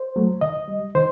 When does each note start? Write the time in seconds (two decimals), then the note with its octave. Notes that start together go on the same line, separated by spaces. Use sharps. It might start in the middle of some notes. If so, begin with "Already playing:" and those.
Already playing: C5
0.16 F#3 A3
0.41 D#3 D#5
0.68 G3
0.95 D#3 C5